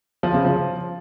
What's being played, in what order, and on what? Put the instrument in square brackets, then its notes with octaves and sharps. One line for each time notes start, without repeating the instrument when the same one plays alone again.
[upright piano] F3
C#3
F3